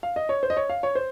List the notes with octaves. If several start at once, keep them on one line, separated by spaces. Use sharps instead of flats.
F5
D#5
C#5
C5
D#5
C#5
F5
C#5
C5